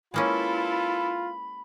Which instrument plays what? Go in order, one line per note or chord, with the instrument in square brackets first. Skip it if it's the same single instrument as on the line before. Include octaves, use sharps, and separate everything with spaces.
[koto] G#3 A#3 C#4 [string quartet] E4 A4 B4 [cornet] F4 [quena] B5